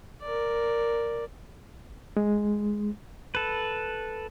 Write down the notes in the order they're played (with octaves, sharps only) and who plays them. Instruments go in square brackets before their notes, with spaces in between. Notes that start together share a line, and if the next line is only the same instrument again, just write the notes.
[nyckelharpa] A#4 D5
[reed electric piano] G#3
[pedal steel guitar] A4 B4